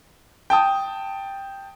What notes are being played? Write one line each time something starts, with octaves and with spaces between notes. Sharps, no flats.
G5 A5 D#6